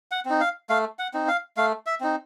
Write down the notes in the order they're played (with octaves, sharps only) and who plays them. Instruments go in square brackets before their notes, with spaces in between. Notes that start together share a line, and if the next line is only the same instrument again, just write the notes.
[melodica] F#5
C4 D#4
F5
A3 F5
F#5
C4 D#4
F5
A3 F5
E5
C4 D#4